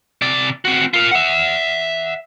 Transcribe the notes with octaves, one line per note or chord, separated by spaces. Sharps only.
C3 D5
C4 F#4
F4 A#4
E5 F#5